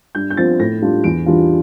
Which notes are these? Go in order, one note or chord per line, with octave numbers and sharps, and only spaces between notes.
G2 G6
G6
F3 C4 F4 A6
A2 A#6
G3 D4 F4
E2 D7
E3 G3 D4 F4